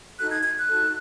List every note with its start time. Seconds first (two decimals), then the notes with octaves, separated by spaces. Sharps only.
0.19 D#4 F#4 A4 F#6
0.31 G#6
0.43 G#6
0.57 F#6
0.68 D#4 F#4 A4